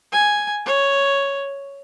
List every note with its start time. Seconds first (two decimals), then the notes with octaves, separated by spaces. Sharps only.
0.12 G#5
0.66 C#5